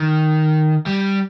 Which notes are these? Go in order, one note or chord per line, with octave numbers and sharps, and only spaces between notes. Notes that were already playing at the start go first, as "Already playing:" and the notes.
Already playing: D#3
G3